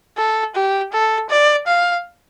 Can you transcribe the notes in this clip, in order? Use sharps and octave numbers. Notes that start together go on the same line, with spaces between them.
A4
G4
A4
D5
F5